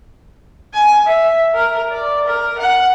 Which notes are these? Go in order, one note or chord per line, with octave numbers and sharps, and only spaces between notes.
G#5
E5
A#4
D5
A#4
F#5